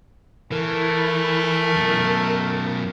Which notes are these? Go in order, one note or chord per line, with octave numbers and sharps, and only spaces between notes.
E3 A3 A#4
F#2 B2